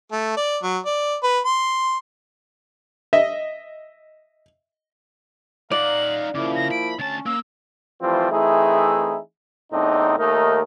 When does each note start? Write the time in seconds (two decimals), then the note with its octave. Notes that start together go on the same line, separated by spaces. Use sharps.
0.12 A3
0.37 D5
0.63 F#3
0.85 D5
1.23 B4
1.45 C6
3.13 D#5 E5
5.71 D#4 D5 F5 F#5 A#5 F#7
6.35 C#3 F3 A#3 E4 D6
6.56 A#6
6.71 B5 D7
6.99 D2 C#4 A5 A6
7.26 A#3 E6
8.01 E3 F3 G3 A3 C4 F4
8.32 E3 A3 C4 D#4 E4 G#4
9.73 E2 A2 C4 D4 D#4
10.19 D#2 A3 D#4 A#4